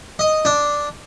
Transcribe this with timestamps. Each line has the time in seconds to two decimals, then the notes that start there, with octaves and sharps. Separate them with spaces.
0.19 D#5
0.45 D4